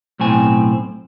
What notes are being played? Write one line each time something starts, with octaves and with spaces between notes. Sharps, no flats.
B1 A2 C4 G#5